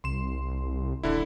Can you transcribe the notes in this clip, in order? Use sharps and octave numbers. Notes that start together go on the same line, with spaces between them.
C2 C6 E7
D#1 D3 E4